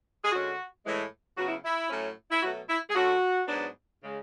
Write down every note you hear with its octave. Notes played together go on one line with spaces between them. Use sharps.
G#4
D3 G#3 C#4 F#4
A2 E3 G#3
C#3 F#3 B3 F#4
E4
E4
A2 F#3 A3 C#4
E4
B2 F#3 A3 F#4
E4
G#4
D3 A3 C#4 F#4
G#2 F#3 B3 D4
C#3 G#3